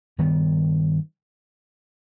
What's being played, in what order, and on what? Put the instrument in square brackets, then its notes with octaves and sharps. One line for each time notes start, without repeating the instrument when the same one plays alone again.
[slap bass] G2 D#3 G3 B3